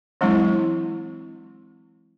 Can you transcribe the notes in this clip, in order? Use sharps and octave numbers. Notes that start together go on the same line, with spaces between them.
E3 F#3 G#3 C4 D4 E4